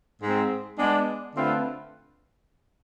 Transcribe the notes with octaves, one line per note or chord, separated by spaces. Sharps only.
G#2 G#3 C4
G#3 B3 D4
D3 A3 C4 F4 B4